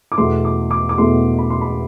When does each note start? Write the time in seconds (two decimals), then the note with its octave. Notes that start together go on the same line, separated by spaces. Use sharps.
0.12 D6
0.18 E2 B2 A3 C6
0.45 D6
0.71 D6
0.89 D6
0.98 E2 B2 A3 C6
1.38 B5
1.50 C6
1.61 B5